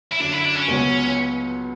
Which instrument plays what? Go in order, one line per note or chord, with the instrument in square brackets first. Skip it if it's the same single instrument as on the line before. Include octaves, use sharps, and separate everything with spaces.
[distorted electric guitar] E4
[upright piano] F#2 D3 F#3 [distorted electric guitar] D4
[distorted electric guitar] E4
D4
C#4
[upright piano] C#2 B2 F#3 B3